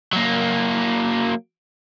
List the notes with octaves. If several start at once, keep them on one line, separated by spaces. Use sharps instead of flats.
F#3 A#3